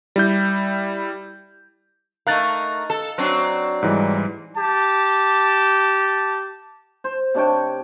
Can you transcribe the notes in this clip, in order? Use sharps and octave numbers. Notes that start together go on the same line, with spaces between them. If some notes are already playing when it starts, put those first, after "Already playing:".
G3 E4 G6
A3 D#4 A#4 F5 F#6 A6
A4
F#3 C4 D4
G#2 E3 G3
G4 A5
C5
C3 D4 C#5 G5